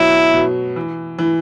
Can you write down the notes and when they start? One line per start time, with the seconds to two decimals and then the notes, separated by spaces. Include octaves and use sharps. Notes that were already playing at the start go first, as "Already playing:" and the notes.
Already playing: B2 F#3 E4
0.34 B2
0.76 E3
1.19 E3